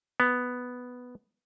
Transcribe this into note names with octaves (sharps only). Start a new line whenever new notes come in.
B3